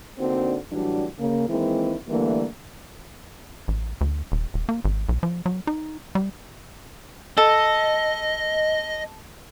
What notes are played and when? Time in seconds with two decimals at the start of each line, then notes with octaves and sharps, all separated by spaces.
0.18 D3 A#3 C4 D4 D#4 F#4
0.71 A2 E3 F#3 G3 D4 F#4
1.19 C#3 A#3
1.48 D#3 E3 G#3 A#3 C4 E4
2.08 D3 E3 G3 A3 A#3
3.68 A1
4.01 D2
4.32 D#1
4.54 D#1
4.69 A#3
4.85 G#1
5.09 B1
5.23 F3
5.46 F#3
5.67 D#4
6.15 G3
7.38 A4 D#5